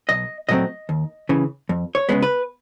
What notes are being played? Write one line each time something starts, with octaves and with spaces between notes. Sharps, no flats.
B1 D#5
A#2 F#3 A3 C4 D#5
D#2
C#3 E3
F2
C#5
C#3 F3 G#3 B3
B4